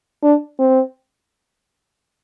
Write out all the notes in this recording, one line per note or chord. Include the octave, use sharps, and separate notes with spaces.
D4
C4